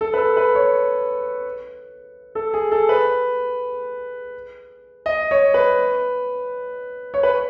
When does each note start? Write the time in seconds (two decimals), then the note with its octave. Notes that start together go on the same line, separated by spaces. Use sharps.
0.01 A4
0.14 B4
0.18 A4
0.37 B4
0.55 C#5
2.35 A4
2.54 G#4
2.72 A4
2.89 B4
5.06 D#5
5.31 C#5
5.54 B4
7.14 C#5
7.23 B4